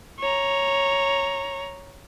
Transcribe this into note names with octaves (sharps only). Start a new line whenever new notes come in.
C#5 A#5